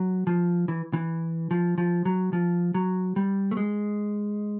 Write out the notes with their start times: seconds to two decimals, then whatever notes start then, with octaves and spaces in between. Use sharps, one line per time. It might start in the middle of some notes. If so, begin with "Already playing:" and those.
Already playing: F#3
0.27 F3
0.68 E3
0.93 E3
1.51 F3
1.78 F3
2.05 F#3
2.33 F3
2.74 F#3
3.16 G3
3.51 A3
3.57 G#3